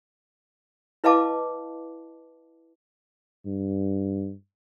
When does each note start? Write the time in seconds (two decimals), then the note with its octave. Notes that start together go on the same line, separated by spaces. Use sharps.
1.04 E4 B4 D#5 F5 A5 D6
3.46 G2